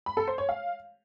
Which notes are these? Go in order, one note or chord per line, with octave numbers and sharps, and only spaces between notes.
B5
A4
C5
C#5
F5